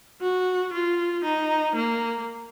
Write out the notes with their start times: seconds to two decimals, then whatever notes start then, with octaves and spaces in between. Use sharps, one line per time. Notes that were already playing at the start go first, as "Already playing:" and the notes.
0.21 F#4
0.73 F4
1.24 D#4
1.75 A#3